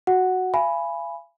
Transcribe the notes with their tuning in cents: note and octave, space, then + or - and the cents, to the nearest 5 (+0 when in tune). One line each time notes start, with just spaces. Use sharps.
F#4 +0 F#5 +0
F5 -45 G#5 +0 B5 +0